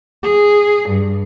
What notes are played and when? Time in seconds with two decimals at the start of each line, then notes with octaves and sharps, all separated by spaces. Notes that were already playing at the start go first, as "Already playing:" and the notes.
0.23 G#4
0.89 G2